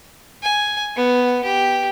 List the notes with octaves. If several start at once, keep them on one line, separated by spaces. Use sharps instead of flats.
G#5
B3
G4